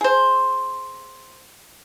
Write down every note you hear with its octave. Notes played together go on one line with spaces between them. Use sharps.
G#4 C5